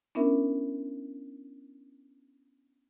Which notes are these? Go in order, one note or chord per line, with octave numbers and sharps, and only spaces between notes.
B3 C#4 D4 E4 A#4 E5